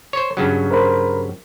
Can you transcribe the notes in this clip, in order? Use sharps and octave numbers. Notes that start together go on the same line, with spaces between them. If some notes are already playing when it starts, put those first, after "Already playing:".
C5 C#5
G2 C#3 F#3
A#4 C5 B5